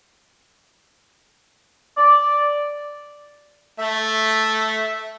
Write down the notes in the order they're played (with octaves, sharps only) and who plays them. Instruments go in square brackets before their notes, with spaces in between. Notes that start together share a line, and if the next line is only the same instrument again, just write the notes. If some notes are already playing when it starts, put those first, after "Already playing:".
[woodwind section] D5
[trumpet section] A3 [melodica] E5